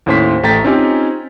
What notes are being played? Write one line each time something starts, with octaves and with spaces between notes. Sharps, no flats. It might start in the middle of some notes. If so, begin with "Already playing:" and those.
D#2 A2 C#4 C5 C6 B6
A1 A3 G5 A#5 A6 B6
C4 C#4 D#4 F4 G4 G#5